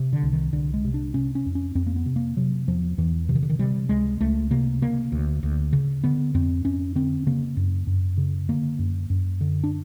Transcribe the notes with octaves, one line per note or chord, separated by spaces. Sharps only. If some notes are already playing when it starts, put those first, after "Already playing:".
Already playing: C3
D3
C2
D#3
C2 D3
G#3
C3
D4
C3 C#4
C#4
F2
C#4
F2 C4
A#3
B3
C3
A#3
C3 F#3
E2 F3
E2 E3
C3 E3
D#3
D3
D#3
C3 G3
C#2 G#3
C#2 A3
C3 A#3
C#3 A#3
D2
D2
C#3
D3 B3
F2 C4
F2 C#4
D3 C4
C#3 A#3
F#2
F#2
C#3
D3 A#3
F#2
F#2
D3
D4